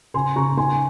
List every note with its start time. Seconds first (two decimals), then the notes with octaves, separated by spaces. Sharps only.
0.14 C#3 G#5 C6
0.36 C#3 A#5 C#6
0.57 D#4 G#5 C6
0.71 G#5